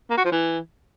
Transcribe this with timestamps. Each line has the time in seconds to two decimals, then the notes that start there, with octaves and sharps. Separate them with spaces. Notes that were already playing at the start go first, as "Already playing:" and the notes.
0.10 A#3
0.18 F#4
0.25 F3
0.32 E3